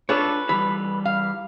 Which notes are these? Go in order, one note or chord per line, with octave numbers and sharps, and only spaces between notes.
D4 F4 A4 B4 C#5
E3 G3 B5
F5